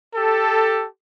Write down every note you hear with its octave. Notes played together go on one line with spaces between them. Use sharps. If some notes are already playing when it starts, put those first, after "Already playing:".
G4 A4